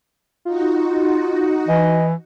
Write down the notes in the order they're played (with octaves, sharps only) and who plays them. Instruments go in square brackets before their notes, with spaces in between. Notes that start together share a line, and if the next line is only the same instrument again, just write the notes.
[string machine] D#4 F#4 [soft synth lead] F4
[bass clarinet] E3 [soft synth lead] D#5